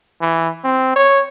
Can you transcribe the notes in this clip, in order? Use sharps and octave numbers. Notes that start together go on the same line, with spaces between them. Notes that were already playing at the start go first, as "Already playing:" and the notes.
E3
C4
C#5